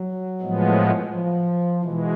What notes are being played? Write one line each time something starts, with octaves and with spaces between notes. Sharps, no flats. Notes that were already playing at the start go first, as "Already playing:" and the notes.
Already playing: F#3
A2 F3 G#3 B3
F3
B2 E3 G#3